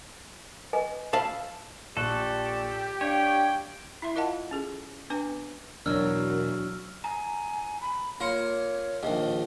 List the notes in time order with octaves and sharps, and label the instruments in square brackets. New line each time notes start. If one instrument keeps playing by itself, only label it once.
[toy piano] B4 D#5 G#5
[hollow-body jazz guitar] F5 A5 B5 [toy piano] E6
[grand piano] A#1 C#6 F#6 [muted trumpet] G4 [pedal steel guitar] A4 [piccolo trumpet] D5
[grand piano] D4 F5 [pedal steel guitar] C#5 [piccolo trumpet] G5
[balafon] E4 E5 C6
F4 A#4 D#5 F5 F#5 A5
C#4 G#4 A4
B3 D4 B4 G#5 D6
[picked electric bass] E2 B2 [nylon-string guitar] F#3 D4 [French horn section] F#4 A#4 [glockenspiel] E6 F6
[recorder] G#5 [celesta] A#5
[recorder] B5
[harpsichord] A#3 [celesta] F4 C6 C#7 [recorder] C#5
[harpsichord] A#1 D#2 [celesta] D#5